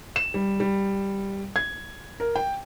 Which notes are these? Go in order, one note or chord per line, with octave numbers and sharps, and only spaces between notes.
E7
G3
G3
G#6
A#4
G5